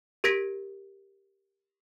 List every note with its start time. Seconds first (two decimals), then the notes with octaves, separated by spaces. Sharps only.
0.24 G4 A#4 G#6 A#6 B6 D7